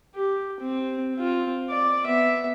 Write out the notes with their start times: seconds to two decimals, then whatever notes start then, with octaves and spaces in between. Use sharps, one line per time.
0.15 G4
0.60 C4
1.15 C4 F4
1.70 D5
2.05 B3 E5